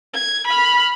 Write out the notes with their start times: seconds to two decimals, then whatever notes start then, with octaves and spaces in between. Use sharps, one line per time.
0.14 G#6
0.47 B5 F6